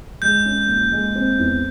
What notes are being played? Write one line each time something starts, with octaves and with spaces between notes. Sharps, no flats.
G#3 G6
C#4
A#2
G#3
C4
E2